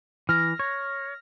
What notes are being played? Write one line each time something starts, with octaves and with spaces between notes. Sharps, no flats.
E3 F6 A#6
C#5